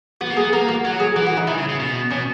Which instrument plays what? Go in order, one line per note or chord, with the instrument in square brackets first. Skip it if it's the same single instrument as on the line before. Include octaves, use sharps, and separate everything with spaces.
[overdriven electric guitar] B3 [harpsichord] F#4
[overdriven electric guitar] A#3
[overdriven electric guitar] B3 [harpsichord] G#4
[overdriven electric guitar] A#3 [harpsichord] A#4
[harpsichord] F#4
[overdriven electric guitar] F#3 [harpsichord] F#4
[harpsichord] G#4
[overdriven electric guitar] E3 [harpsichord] F#4
[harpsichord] F#4
D#4
[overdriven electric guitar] D#3 [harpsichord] E4
[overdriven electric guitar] C#3
C#3
B2
[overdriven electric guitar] B2 [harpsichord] C#4